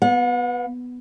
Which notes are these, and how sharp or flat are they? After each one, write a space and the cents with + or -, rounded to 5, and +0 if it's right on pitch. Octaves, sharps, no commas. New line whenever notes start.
B3 +0 F#5 -45